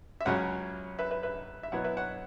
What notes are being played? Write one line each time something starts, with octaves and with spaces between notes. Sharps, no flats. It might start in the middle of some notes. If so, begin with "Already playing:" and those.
E5
C#2 C#3 F#3 C#4 C#5 F#5
B4 E5
B4 E5
B4 E5
E5
B2 F#3 B3 E4 C#5 F#5
B4 E5
C#5 F#5